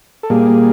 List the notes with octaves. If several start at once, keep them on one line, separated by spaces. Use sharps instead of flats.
A4
A#2 G3 A#3 G#4